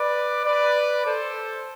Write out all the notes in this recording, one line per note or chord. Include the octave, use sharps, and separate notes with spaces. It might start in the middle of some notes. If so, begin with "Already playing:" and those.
Already playing: B4 D5
B4 D5
A4 C5